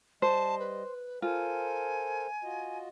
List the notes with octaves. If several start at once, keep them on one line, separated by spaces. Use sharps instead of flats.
G3 C5 D#5 A5
B4
F4 A4 A#4 C5 G#5
F4 F#4 D#5